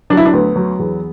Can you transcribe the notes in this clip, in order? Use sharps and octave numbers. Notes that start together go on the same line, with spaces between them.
F#3 D4
E4
D4
D2 B3
F#3
E2